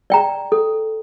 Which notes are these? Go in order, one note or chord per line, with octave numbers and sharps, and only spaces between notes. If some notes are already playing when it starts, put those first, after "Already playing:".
D5 G5 A#5
A4